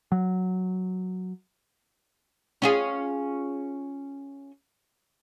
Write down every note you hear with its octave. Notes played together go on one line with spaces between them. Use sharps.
F#3
C#4 F4 G#4